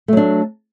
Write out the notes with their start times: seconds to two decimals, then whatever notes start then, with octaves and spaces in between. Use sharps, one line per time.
0.08 A3
0.13 F#3
0.17 D4